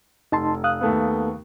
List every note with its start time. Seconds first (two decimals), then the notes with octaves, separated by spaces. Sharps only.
0.32 F1 D#4 A5 C6
0.64 F5 D#6 F#6
0.81 D#2 A3 B3